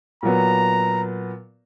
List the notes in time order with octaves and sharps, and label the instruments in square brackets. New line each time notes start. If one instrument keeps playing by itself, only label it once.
[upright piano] A#2 F#3 B3 [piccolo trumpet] A#5